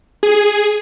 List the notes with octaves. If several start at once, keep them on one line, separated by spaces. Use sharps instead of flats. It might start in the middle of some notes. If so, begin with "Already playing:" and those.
G#4